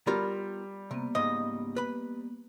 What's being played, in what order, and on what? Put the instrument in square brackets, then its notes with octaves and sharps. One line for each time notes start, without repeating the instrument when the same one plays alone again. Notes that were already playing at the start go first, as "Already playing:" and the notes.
[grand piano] G3 [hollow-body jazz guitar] B3 F4 A#4
[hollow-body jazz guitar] C3 [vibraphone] A#3 B3
[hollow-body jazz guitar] C#2 G#2 [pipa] D#5
[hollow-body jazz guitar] B4 B5